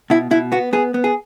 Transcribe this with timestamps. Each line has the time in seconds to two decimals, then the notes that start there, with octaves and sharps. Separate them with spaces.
0.10 B2 E4
0.31 B2 E4
0.52 B3 F#4
0.73 B3 G#4
0.94 B3
1.04 G#4